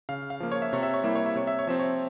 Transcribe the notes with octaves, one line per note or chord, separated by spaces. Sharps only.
C#3 F5
F5
F3 A#3
C#5
E5
C3 C#5
E5
C#5
G3 A#3 E4 E5
C#5
E5
C3 C#5
E5
C#5
F3 C4 E5
C#5